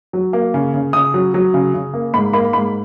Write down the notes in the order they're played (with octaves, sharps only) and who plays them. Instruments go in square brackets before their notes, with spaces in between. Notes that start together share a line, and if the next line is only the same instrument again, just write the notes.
[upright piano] F#3
A#3
C#3
C#3
C#3 D#6
F#3
F#3
C#3
C#3
A#3
G#2 B5
A#3 B5
G#2 B5